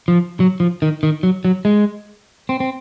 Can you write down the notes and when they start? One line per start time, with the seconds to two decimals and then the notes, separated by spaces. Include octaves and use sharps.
0.08 F3
0.40 F#3
0.60 F3
0.82 D#3
1.03 D#3
1.23 F#3
1.45 F#3
1.65 G#3
2.49 C4
2.60 C4